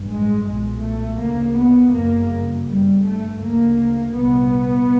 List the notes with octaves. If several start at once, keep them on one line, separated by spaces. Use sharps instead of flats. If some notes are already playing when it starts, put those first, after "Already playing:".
Already playing: A1 G2
G#3
B1 A#2 G#3
A3
D2 C#3 A#3
B3
G1 F#2 C#3 A#3
G1 G2 G3
A3
D2 C#3 A#3
C2 A#2 B3